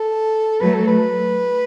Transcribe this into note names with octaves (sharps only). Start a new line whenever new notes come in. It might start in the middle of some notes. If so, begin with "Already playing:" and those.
Already playing: A4
F#3 A3 B4
A4
B4